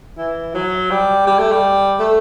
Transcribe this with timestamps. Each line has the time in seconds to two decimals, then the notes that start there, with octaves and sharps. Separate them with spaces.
0.18 E3
0.54 F#3
0.90 G3
1.27 G3
1.39 A3
1.52 G3
1.99 A3